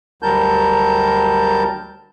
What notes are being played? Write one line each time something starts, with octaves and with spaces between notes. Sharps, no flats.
D2 F#3 G3 A#4 A5 G6